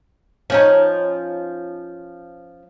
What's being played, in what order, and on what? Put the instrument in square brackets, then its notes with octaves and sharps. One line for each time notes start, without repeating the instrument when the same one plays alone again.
[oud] F3 C#4 D#4